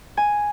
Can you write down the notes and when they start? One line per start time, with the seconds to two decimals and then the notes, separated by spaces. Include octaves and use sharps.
0.17 G#5